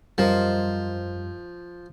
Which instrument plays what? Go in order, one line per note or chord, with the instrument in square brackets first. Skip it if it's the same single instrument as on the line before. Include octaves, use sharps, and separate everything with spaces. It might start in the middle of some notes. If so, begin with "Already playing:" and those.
[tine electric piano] F#2 [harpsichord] F3 [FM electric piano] G3 [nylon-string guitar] A#4 C5 D#5